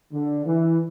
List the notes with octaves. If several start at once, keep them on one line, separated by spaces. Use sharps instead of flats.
D3
E3